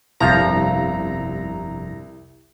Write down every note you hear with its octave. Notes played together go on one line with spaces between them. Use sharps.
G1 C2 F2 F3 A#5